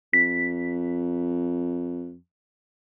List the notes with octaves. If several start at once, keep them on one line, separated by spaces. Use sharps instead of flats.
F2 B6